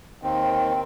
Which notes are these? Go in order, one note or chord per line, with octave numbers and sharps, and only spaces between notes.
D#2 D#3 C4